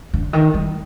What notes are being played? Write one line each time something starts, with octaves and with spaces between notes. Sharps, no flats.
D3
D#3
G3